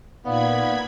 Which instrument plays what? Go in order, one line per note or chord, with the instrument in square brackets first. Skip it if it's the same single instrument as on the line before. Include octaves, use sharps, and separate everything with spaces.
[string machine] A#2 B5 G#6 [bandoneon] B3 [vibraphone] D#4 D5 F5